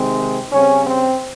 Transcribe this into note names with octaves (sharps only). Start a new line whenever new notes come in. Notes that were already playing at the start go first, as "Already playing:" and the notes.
Already playing: C3 D#3 G#3 C4
C#3 G3 C4 C#4
C4